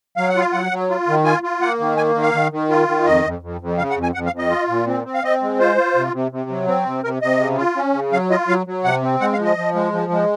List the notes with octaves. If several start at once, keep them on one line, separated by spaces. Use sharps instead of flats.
F#3 F5
F#5
F4 F5
F#3 F#5
F#3
F4
D#3
F4 G#5
F4
A#3 F#5
D#3
A#3 G#5
D#3
F5
D#3
D#3
F4
D#3
F2 D#5
F2
F2
F2
C#3 F5
F#5
F2
G#5
F2 F#5
F5
F2
D#5
F4
A#2
C4
C4
F5
C4 D#5
G#3
F4 C5
F4
C3
C3
C3
F#3
C4
C3
C3 A#4
C3 D#5
C#3
F4
C#4
C#3
F#3 F5
F4 D#5
F#3 F5
F#3
C3 F#5
C4
G#3 F#5
F5
F3
D#5
F3
G#3
F3
G#3